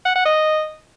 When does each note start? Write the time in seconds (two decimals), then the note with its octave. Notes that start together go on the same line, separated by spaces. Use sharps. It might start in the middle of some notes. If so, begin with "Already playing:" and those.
0.05 F#5
0.15 F#5
0.25 D#5